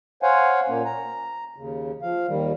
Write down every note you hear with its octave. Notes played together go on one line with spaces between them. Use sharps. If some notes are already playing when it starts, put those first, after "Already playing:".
C5 C#5 F5 F#5 G#5
A#2 A#3 C#4
A#5
D#2 C#3
F3 F5
D#2 D#3 G3